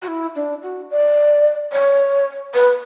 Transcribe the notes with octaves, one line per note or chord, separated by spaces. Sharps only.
F#4
E4
D4
F#4
D5
C#5
B4